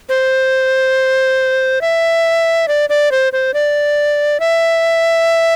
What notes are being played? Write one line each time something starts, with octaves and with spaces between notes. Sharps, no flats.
C5
E5
D5
D5
C5
C5
D5
E5